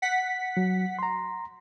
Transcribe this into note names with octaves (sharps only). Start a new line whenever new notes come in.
F#5 B6
F#3
A#5 C6